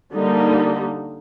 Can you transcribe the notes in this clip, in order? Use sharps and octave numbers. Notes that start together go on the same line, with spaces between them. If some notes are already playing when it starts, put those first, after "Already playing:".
D3 G3 A#3 D#4